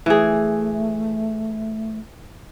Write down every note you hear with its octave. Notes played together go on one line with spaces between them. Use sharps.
E3 A3 G#4